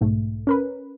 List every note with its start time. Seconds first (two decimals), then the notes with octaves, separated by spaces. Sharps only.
0.01 B1 G#2 A3
0.47 C#4 A#4 B4